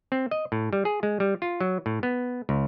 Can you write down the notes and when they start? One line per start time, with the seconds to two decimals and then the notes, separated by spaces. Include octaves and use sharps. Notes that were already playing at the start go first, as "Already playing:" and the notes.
0.12 C4
0.31 D#5
0.52 A2
0.73 G3
0.85 G#4
1.03 G#3
1.20 G3
1.42 F4
1.61 F#3
1.86 A2
2.03 B3
2.49 C#2